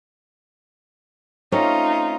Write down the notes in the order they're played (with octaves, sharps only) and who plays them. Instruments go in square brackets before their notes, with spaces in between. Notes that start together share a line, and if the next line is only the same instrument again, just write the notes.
[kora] A3 C4 C#4 [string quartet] D#4 F4